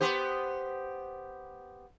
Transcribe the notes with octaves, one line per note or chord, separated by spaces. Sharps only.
B3 G4 C5